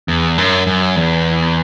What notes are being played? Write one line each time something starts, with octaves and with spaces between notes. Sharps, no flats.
E2
F#2
F#2
E2